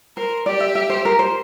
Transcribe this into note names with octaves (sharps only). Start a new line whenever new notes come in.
A#4 C5
G4 D5
E5
E5
C5
A#4
C5